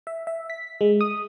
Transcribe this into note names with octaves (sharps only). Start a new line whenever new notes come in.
E5
E5
B6
G#3
D#6